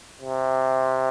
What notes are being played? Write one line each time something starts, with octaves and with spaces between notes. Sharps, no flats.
C3